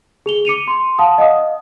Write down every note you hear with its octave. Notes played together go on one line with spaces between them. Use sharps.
G#4 F7 G7
D6 C#7 D#7 F7
C6
F5 F#5 A5 D#6
D#5 F5 F#5 D#6